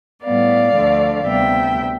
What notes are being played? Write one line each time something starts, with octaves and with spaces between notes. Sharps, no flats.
A2 G3 B3 D5 F5
D2 D3 F3 A3
D2 C3 G3 B3 E5 G5